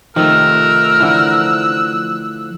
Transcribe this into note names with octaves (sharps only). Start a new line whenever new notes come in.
D#3 F3 A3 A#4 E6 F#6
D3 E3